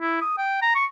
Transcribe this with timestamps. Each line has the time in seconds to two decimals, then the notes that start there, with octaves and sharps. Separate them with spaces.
0.01 E4
0.21 D#6
0.38 G5
0.62 A#5
0.75 C#6